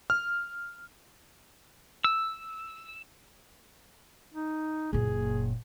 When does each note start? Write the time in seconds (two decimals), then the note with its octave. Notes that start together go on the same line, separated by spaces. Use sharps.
0.10 F6
2.04 E6
4.34 D#4
4.93 F#1 A#2 G#4